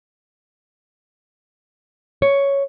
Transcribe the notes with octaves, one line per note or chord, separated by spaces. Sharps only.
C#5